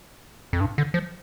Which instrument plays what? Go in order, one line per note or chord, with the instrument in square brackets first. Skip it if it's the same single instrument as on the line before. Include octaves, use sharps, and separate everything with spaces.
[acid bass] F2
G2
D3
F3